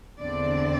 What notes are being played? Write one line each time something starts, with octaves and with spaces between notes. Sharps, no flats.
E2 D3 C4 D4 D5